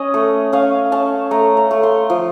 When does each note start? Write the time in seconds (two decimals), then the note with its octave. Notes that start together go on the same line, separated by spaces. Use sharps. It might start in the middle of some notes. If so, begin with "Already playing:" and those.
Already playing: C#4 D#5
0.14 A3
0.53 C#4 F5
0.92 C#4 A5
1.31 A3 A#5
1.57 A#5
1.71 A3
1.83 C6
2.10 F3